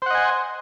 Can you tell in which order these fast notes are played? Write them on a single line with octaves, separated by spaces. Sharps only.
C5 F#5 D#5 G#5